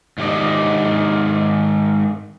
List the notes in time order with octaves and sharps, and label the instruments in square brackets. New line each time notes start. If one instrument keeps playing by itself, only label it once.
[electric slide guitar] G#2 D#3 G4 D5 D#5